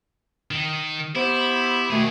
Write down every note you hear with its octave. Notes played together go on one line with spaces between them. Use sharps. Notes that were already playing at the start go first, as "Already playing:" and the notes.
D#3
B3 E4 G4 C5
B2 D#3 F#3 A3 G#4